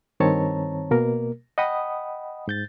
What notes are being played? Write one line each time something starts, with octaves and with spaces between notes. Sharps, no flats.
G2 D#3 C4 C#5 A5 A#5
B2 A#3 A#4
D#5 F#5 G5 B5 D#6
G#2 G6 A6